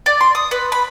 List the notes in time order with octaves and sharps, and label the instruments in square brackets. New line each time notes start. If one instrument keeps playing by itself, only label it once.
[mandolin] D5
C6
D#6
B4
B5